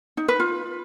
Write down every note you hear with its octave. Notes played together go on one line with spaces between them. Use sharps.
D#4
B4
F4